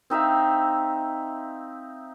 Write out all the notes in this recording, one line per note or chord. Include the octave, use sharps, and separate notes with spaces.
C4 D#4 E5 F5